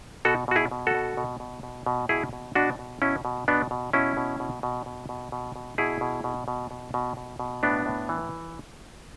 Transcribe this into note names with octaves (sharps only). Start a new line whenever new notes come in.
B2 F#4 A4
B2 F#4
E4 G#4
B2
F#4 A4
B2
B2
B2
B2
B2
B2 E4 G#4
B2
B2 D4 F#4
B2
B2 C#4 E4
B2
B2 B3 D4
B2
B2 C#4 E4
B2
B2
B2
B2
B2
B2
B2
B2 E4 G#4
B2
B2
B2
B2
B2
B2
B2
A2 B3 D4
A2
E3